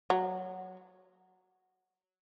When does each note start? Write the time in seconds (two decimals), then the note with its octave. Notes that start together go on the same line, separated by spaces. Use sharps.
0.10 F#3